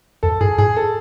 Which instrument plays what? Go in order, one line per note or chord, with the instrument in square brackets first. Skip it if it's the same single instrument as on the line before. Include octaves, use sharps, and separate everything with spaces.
[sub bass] F2 [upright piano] A4
[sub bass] G2 [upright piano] G#4
[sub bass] G#2 [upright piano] G#4
[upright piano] A4